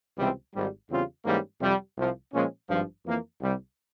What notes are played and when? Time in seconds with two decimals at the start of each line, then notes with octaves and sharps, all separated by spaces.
0.18 C#2 C3 E3 G3 C4
0.54 G#1 G#2 G3
0.89 E2 C#3 G3 C4 F4
1.24 G#2 E3 G3 A#3 C#4
1.60 F2 C3 G3
1.96 C2 C3 F3
2.32 A#2 F3 G#3 C#4
2.69 G#1 G2 F3
3.04 F2 E3 A#3
3.40 C2 C3 G3